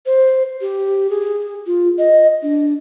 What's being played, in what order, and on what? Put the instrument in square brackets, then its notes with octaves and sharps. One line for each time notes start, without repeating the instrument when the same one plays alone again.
[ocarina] C5
G4
G#4
F4
D#5
D4